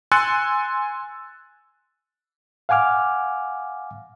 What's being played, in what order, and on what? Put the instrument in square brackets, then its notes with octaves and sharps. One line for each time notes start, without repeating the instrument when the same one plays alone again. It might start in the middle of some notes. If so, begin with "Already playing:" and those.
[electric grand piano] G#5 C6 E6 F#6 A6 C#7
[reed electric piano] F5 F#5 G#5 D6 F6